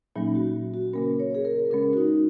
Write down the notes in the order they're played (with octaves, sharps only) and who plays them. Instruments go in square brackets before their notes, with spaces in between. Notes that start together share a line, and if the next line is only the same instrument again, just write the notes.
[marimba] A#2 F#3 A#3 C#4 [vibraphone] D#4
[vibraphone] F#4
F#4
[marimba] C#3 A#3 C#4 [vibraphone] A#4
[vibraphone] C#5
G#4
A#4
[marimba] C#3 G#3 C#4 [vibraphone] A#4
[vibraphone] F#4
D#4